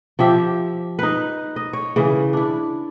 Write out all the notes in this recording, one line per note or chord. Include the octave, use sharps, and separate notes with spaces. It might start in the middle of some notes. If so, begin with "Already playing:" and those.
F3 G4 E5 F5
D#4 B4
D#5
C#5
C#3 E3
D4 E4